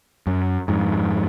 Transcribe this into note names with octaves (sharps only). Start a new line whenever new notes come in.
F#2
F2 G#2